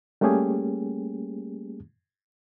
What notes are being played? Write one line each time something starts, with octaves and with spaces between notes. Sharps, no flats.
G3 A3 A#3 C#4 G4 G#4